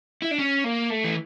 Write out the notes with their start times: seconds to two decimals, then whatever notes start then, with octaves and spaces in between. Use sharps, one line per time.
0.22 E4
0.31 D4
0.38 C#4
0.64 A#3
0.90 A3
1.05 E3